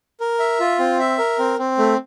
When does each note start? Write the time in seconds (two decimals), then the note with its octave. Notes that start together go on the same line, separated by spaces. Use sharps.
0.20 A#4
0.39 E5
0.60 F4
0.79 C4
0.99 E5
1.18 A#4
1.39 C4
1.59 C4
1.78 A3